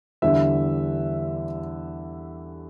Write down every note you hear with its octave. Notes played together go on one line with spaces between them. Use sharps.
E2 D3 G3 E5